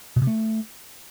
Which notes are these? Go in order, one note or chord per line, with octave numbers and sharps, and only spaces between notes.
B2
C3
A3